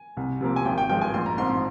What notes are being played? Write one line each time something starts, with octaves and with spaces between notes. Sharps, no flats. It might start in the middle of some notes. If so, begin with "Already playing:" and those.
Already playing: G#5
C2
C3 F3 A#3
G#5
G#1 G5
G5
G2 F3 G#3 G5
G#5
A#1 C6
A#5
G#2 F3 C4 C6
C6